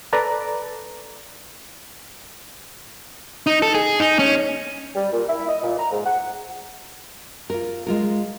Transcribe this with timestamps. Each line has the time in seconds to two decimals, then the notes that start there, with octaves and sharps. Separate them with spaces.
0.13 A4 B4 D5 A#5
3.47 D#4
3.62 A4
3.75 G#4
4.00 D#4
4.19 C#4
4.95 G3
5.12 A#2
5.29 E4
5.49 D#5
5.63 A#2
5.79 A#5
5.92 G#2
6.05 F#5
7.50 F4 A#4
7.87 G#3 F4 A#4